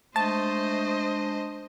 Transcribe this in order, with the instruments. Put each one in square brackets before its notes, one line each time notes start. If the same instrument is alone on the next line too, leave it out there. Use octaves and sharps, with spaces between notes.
[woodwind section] G#3 D4 [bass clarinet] A3 [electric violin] C5 D#5 [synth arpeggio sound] A5